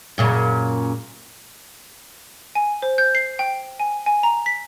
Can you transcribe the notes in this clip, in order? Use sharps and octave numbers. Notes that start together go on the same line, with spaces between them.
F#2 A#2 C#3
G#5
C5
G6
C7
G5
G#5
G#5
A#5
B6